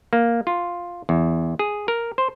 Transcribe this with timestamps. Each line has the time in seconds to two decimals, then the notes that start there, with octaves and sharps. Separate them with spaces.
0.13 A#3
0.47 F4
1.09 E2
1.59 G#4
1.88 A#4
2.18 C5